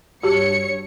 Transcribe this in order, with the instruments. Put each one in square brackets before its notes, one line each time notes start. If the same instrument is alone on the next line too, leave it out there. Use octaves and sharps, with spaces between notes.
[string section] G2 C#5 C#7 [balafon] F#4 G4 A5